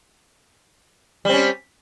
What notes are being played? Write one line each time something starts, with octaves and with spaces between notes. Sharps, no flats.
G3 C4 C#4